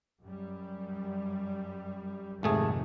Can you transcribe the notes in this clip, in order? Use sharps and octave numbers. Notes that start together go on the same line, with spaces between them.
F#2 G3
G#1 F2 C3 D#3 A3 G#4